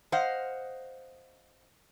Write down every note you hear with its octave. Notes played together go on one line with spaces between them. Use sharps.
C5 D#5 F5 F#5